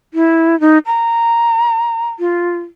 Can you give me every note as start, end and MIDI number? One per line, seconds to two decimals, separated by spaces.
0.14 0.59 64
0.60 0.78 63
0.86 2.08 82
2.20 2.58 65